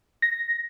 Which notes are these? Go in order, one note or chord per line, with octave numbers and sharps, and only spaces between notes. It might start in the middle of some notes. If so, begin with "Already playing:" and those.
A#6